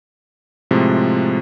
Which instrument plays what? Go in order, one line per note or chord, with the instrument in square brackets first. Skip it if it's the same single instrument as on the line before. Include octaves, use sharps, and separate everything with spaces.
[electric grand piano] A2 C3 F3 G#3